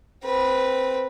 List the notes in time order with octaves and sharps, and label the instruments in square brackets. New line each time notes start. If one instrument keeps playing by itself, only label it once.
[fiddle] C4 B4